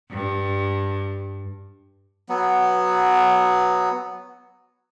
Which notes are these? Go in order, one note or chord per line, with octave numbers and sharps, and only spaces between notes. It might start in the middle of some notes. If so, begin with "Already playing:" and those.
G2
F#3 B3